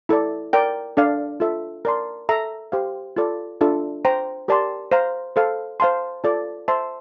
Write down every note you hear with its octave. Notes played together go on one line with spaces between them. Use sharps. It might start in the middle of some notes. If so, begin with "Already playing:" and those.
E4 A4 D5
A#4 D5 G5
D4 A4 D5 F5
F4 A4 E5
A#4 D5 A5 C6
A4 E5 A#5
G4 C5 F5
F4 A4 D5
D4 F4 A4 E5
C5 G5 A#5
G4 A#4 D5 A5 C6
C5 F5 A#5
A4 C5 F5
C5 F5 A5 C6
F4 A4 D5 A5
C5 E5 A5 C6